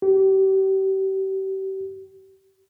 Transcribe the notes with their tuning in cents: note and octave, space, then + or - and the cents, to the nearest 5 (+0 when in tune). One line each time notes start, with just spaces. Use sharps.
G4 -35